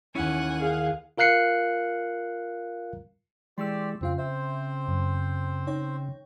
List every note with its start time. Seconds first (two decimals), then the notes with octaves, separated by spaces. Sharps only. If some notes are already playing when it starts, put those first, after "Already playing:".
0.15 D#2 C#4 E4 F#5 G#5
0.57 G#4 F5
1.18 F4 A#4 F5 F#6 C7 C#7
3.58 E3 G#3 G4 D5 C6 C#6 E6
4.01 F2 C#3 C4 F4 F5
4.18 C4 C5 E5
4.88 F#2
5.67 D#4 C#5 G5